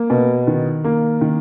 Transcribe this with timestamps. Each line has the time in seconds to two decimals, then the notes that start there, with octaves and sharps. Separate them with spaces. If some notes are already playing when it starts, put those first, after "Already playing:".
Already playing: A#3
0.10 B2
0.47 D#3
0.84 A#3
1.21 D#3